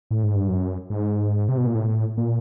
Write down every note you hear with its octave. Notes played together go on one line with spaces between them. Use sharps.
A2
G#2
G2
F#2
G#2
C3
B2
A#2
A2
A#2